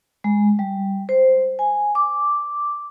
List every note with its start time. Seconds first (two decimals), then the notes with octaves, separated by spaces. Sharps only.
0.24 G#3
0.59 G3
1.09 C5
1.59 G#5
1.95 D6